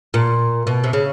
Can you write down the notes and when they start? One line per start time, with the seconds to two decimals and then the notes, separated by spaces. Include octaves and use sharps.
0.14 A#2
0.67 B2
0.84 C3
0.93 C#3